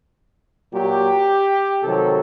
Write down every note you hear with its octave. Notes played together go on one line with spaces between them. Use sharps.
A#2 F#3 G4
C3 D#3 F#3 A4